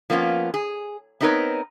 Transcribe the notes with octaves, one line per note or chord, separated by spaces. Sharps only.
F3 A#3 B3 C#4 F4
G#4
B3 C4 D#4 A#4 B4 C#5